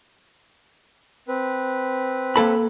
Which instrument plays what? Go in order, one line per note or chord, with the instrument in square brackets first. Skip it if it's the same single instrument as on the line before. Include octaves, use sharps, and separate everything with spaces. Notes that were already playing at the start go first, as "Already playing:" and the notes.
[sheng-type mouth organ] C4 B4
[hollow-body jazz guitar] A#3 A4 B5